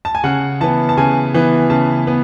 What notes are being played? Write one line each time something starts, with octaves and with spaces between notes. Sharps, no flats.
A5
G#5
C#3 F#5
E3 B3 A5
A5
C#3 G#5
E3 B3
C#3 A5
B3